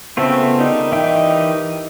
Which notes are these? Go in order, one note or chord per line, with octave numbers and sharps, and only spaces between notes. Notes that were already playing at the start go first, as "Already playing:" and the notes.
C#3 A3 B3 C4 F4
D#3 G3 D#4
E3 E5 G5